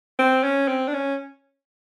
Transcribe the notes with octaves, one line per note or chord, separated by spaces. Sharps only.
C4
C#4
C4
D4
C#4